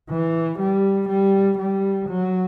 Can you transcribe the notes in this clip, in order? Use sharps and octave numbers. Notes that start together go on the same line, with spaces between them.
E3
G3
G3
G3
F#3